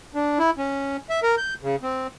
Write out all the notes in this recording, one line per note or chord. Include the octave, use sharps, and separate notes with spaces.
D4
E4
C#4
E5
A#4
G6
C#3
C4